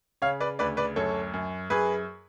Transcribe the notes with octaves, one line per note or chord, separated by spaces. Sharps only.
C#3 C#5 F5
B4 D5
D2 B4 D5
B4 D5
F#2 A4 C#5
F#2
F#2 G#4 B4